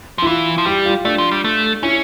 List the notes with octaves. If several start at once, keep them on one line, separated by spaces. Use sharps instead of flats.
F3
E4
E3 F4
F3
G3 G4
F4
A3 D4
F3
G3
A3
C#4 E4